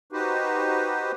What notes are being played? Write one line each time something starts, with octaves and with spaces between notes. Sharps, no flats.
D#4 F#4 G4 B4 C5